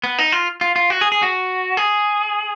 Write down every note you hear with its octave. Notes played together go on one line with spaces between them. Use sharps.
B3
D#4
F4
F4
F4
F#4
G#4
G#4
F#4
G#4